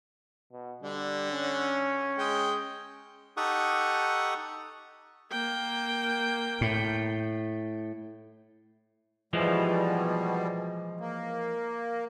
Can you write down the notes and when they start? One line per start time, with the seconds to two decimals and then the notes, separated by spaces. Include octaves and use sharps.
0.52 B2
0.83 D3 G3
1.33 C#4
2.18 G#3 D#5 G5
3.37 D#4 G4 A4 F#5 C#6 D#6
5.32 A#3 G5
6.61 A2
9.33 B2 E3 F3 G3 G#3
11.00 A#3